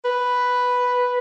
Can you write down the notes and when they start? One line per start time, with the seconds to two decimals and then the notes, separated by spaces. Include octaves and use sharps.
0.05 B4